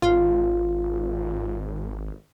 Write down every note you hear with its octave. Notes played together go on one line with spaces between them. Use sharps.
G#1 F4